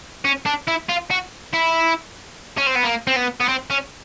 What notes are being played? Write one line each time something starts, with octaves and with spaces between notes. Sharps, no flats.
C#4
D4
E4
F4
F#4
E4
C#4
C4
B3
A#3
C4
B3
B3
C4
C#4